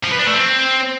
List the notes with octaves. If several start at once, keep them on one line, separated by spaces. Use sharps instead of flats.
F3
B4
D4
A3
C4